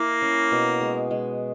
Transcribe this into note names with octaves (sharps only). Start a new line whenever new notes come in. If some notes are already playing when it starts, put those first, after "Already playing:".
Already playing: A#3 E4
C#4
B2
G#3
G#3